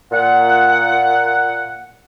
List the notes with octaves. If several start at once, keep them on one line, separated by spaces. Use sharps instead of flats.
A#2 F#5